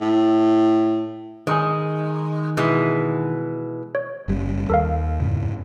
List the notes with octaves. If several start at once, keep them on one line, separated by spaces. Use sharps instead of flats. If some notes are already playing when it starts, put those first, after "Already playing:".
A2
D#3 G#3 D#4 G#4
B2 E3 G#3
C#5
F#1 G3 C#4
D#2 A4 A#4 F5
F2 G#2 C#3